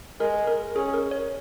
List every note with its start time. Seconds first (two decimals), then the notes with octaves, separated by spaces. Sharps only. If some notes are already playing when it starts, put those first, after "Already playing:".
0.20 G#3 A#4
0.47 A#4
0.75 C#4 G#4
0.94 A#4
1.11 C#5